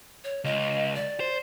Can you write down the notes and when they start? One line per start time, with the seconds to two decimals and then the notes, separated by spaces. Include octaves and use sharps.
0.24 C#5
0.44 C#2 D#5
0.95 D5
1.20 C5